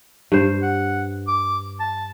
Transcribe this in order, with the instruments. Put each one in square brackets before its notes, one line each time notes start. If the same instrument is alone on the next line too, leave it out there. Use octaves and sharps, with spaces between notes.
[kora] G2 C5
[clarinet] F#5
D6
A5